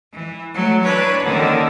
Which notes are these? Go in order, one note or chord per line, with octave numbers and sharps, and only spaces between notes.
E3
F#3 A3
E3 D4 B4 C#5
F#2 D3 D#3 A#3